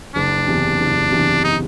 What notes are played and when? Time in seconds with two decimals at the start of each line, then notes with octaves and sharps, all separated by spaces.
0.15 F#1 D4
0.47 E2 C3
0.80 F#1
1.11 E2 C3
1.44 D#4